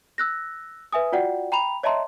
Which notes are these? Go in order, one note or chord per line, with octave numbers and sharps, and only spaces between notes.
E6 F#6 A#6
B4 E5 G#5 D#6
F4 F#4 D5 F#5 G5
G5 A#5 B5 F7
C#5 D#5 E5 A5 A#5 C6